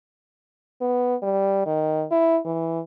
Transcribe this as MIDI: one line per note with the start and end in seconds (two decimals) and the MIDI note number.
0.81 1.15 59
1.23 1.62 55
1.66 2.04 51
2.11 2.39 64
2.45 2.80 52